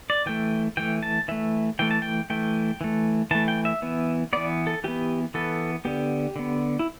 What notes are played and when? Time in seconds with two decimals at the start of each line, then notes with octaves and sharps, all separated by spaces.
0.10 D5
0.26 E3 A3 G5
0.77 E3 A3 G5
1.03 A5
1.28 E3 A3 E5
1.79 E3 A3 G5
1.91 A5
2.02 G5
2.30 E3 A3 G5
2.81 E3 A3
3.31 E3 A3 A5
3.48 G5
3.65 E5
3.82 E3 B3
4.33 E3 B3 D5
4.67 A4
4.84 E3 B3 G4
5.34 E3 B3 A4
5.85 D3 B3 G4
6.36 D3 B3
6.79 E4